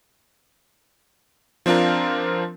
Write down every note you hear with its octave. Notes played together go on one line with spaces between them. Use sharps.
F3 C4 D4 F4 A#4